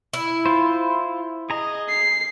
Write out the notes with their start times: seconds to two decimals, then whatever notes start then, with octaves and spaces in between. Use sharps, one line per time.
0.13 E4
0.46 F4 C5
1.50 G#4 D#5 A#5
1.89 C7